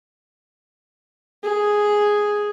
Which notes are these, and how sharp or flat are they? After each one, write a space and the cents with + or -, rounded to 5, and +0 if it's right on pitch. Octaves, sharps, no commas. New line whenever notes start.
G#4 +0